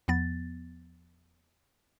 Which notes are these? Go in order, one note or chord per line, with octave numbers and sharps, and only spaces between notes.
E2 F3 B3 A6